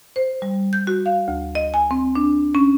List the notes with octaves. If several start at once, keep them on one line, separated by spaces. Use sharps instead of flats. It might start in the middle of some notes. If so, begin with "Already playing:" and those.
C5
G3
G6
F#4
F5
D2
D#5
G#5
C4
D4
C#4